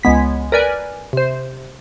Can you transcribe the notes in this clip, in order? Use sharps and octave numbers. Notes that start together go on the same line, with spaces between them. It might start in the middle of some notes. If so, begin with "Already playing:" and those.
C#2 G#3 B3 B6
A#4 B4 D5 G#5
C3 C5